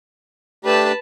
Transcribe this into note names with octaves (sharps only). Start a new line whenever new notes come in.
A3 D4 G4 B4 A5